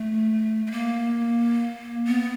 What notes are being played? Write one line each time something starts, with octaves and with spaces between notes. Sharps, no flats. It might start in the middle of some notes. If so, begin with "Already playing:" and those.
Already playing: A3
A3
A#3
B3